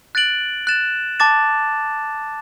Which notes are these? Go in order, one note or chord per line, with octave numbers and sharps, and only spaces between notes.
F#6 A6 D7 F#7
F#6 A6 E7
A5 D6 A6 E7